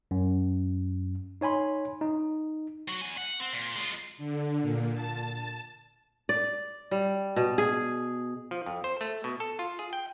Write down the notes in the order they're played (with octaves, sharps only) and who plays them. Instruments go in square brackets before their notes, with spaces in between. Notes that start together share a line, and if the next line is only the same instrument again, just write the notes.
[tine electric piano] F#2
D#4 C#5 G#5 B5 C6
D#4
[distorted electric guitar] F#3 F#4
E2 G#5
F#5
C4
A#2
G#3 F4
[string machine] D3
A#2
A5
[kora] D5
G3
B2
G#4
[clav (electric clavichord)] F3
F2
C5
A3
B2
A4
F4
G#4
G5